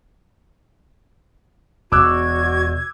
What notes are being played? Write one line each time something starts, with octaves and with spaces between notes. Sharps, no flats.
E1 F#4 D6 E6 F#6 G#6